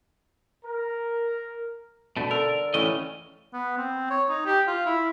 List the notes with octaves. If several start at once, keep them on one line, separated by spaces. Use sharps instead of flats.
A#4
B2 D3 A3
A4 A#4
A2 E3 A3 C#4 D#5 F5
B3
C4
C#5
D#4
G4
F4
E4